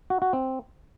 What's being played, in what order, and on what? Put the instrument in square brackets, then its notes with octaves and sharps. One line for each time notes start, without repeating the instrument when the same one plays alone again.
[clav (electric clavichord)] F#4
F#4
C4